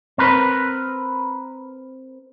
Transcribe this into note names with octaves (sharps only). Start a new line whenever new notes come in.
C4 A#4 B4